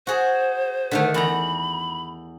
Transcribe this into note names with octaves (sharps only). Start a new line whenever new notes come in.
F#4 G#4 C5
D3 D#3 A3
E2 A#5 B5